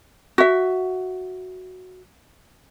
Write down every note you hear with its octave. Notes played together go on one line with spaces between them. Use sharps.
F#4 E5